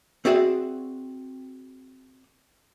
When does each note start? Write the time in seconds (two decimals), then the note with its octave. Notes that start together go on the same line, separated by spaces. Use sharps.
0.25 C4 F#4 G#4 D5 E5 F#5